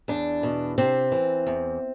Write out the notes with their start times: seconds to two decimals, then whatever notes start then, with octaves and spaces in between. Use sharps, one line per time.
0.08 E2 D4
0.43 B2
0.78 C3 C4
1.12 E3
1.47 E2